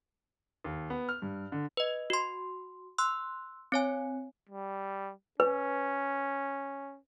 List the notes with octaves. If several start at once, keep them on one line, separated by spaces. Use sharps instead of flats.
D#2
B3
F6
G2
D3
B4 D#5
F#4 C6
C6 E6 F#6
C4 C#5 G#5
G3
C#4 B4